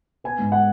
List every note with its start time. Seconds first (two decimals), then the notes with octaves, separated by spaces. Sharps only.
0.24 B3 G#5
0.38 G#2
0.52 G#3 F#5